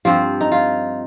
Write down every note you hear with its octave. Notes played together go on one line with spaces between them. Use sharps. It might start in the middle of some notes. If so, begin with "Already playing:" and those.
G2 F3 C4 F4
D#4
F4